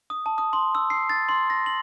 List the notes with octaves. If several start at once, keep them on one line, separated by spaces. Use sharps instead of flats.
D#6
A5
D#6
C6
E6
C7
A6
C6
A#6
F#7